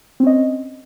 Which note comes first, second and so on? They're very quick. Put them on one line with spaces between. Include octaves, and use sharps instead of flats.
C4 C#4 D#5